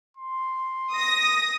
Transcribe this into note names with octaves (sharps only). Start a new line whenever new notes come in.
C6
D#6 A#6